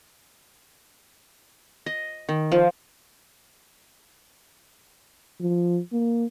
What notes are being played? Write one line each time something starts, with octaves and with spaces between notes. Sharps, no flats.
D#5
D#3
F3
F3
A#3